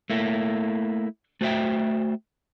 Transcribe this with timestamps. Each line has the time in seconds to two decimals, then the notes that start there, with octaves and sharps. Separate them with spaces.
0.10 A3 A#3 E4
1.41 A3 F#4 C5 C#5 E5 G5